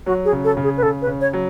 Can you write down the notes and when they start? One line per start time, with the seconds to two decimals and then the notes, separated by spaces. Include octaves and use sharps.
0.06 F#3 F#4
0.25 G#4
0.32 C#3
0.44 A4
0.57 C#3
0.64 G#4
0.77 B4
0.82 C#3 A4
1.02 B4
1.07 C#3
1.21 C#5
1.33 F#3